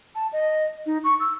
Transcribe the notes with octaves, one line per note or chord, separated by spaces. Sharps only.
A5
D#5
D#4
C#6
E6